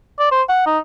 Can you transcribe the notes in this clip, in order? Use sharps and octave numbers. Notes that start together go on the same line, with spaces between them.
D5
C5
F#5
D#4